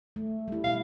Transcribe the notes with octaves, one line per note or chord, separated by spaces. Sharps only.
A3
G3 E4
B2 E4 F5